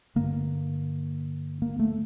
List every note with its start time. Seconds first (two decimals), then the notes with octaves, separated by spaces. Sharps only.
0.16 G2 D3 A#3
1.62 A#3
1.79 A3